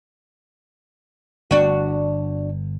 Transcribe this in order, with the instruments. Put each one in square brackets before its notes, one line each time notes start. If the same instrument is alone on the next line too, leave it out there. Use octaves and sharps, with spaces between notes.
[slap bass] G1 [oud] D4 F#4